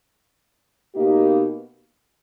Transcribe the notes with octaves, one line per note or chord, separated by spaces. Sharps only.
B2 A#3 D#4 G4